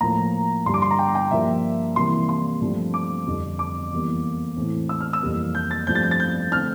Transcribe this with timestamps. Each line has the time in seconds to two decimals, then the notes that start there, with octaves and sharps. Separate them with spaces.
0.01 A2 F3 A#3 A#5
0.66 G2 D3 G3 C6
0.74 D6
0.82 C6
0.91 A#5
0.99 G5
1.15 G5
1.31 G2 F3 A#3 E5
1.96 C3 E3 G3 A#3 C6
2.29 C6
2.61 G2 F3 A3 C4
2.94 D6
3.27 F2 D3 G3
3.59 D6
3.92 E2 E3 G3 A#3
4.56 A2 E3 A3 C4
4.89 E6
5.01 F6
5.13 E6
5.22 F2 E3 G3 A#3
5.55 G6
5.71 A6
5.87 G2 F3 A3 C4 G6
5.95 A6
6.03 G6
6.11 A6
6.20 G6
6.52 D3 A3 C4 F6